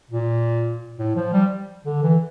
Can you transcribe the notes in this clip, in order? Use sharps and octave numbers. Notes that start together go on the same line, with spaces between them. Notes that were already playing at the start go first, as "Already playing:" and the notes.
A#2
A2
F3
G3
D3
E3